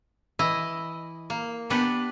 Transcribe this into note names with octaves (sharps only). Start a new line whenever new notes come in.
E3 E4 D#5
A#3
B3 D4 G4 B4